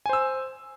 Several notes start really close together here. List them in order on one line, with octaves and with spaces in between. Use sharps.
G#5 C5 E6